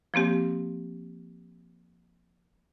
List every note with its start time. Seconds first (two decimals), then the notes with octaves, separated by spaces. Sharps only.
0.14 F3 A#3 C4 G4